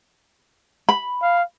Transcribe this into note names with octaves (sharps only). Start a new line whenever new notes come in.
B5
F5